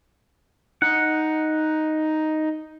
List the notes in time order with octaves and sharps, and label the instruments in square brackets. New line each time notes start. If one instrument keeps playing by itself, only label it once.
[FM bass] D#4 [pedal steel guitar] F#5